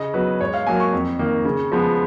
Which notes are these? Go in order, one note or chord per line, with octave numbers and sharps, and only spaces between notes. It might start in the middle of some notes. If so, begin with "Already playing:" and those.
Already playing: C#3 D#5
F#3 B3 B4
G#2 C#5
F5
F#3 A#3 G#5
C#6
F2
D#3 A#3
C#3
F3 G#3 B3